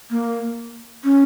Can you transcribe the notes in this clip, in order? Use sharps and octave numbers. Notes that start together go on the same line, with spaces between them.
A#3
C#4